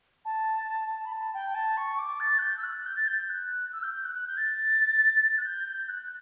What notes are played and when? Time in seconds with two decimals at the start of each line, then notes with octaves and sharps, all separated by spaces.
0.25 A5
1.05 B5
1.12 A5
1.34 G5
1.55 A5
1.77 C#6
1.98 D6
2.20 A6
2.38 F#6
2.42 G6
2.57 E6
2.63 F#6
2.86 G6
2.96 A6
3.07 G6
3.18 G6
3.29 F#6
3.72 E6
3.83 G6
3.93 G6
4.05 F#6
4.15 F#6
4.27 G6
4.37 A6
5.38 F#6
5.45 G6
5.67 G6
5.88 F#6